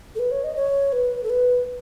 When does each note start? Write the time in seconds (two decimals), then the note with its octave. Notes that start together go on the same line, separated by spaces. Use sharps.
0.15 A4
0.19 B4
0.31 C#5
0.44 D#5
0.56 C#5
0.93 B4
1.24 A4
1.30 B4